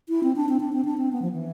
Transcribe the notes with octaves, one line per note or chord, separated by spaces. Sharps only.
E4
C4
D4
C4
D4
C4
D4
C4
B3
F3
E3